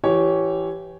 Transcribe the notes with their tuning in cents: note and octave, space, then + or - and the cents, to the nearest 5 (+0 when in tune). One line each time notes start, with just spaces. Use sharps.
E3 +20 G4 -15 C#5 +0